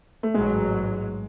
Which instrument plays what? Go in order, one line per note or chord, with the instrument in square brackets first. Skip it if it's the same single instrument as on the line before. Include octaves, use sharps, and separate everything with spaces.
[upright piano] A3
[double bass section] A1 G#2 F#3 [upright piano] G#3